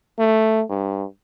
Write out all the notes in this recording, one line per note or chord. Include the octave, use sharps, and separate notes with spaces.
A3
G2